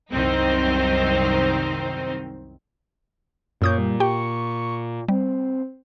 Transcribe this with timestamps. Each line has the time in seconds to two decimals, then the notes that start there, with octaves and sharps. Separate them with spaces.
0.12 C2 F#2 D#3 C4 D#4 C5
3.62 F#2 A#2 C#5 D#6 G6
3.78 G3
4.00 G4 G5 C#6
5.09 G3 C4